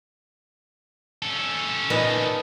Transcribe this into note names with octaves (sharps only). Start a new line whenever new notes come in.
C#4 A4
A#2 B3 D#4